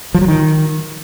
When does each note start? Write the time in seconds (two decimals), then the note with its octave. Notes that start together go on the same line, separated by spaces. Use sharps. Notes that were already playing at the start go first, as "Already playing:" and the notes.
0.14 F3
0.21 F#3
0.28 D#3